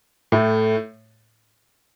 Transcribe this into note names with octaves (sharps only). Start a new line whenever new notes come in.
A2 A3